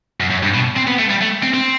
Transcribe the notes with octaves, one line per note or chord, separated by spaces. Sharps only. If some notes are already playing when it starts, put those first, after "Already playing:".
F#2
F#2
G2
B2
C4
B3
A3
G3
A3
C4
C4